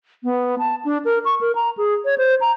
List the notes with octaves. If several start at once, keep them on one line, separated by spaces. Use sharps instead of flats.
B3
A5
D4
A#4
C#6
A#4
A#5
G#4
C#5
C5
A#5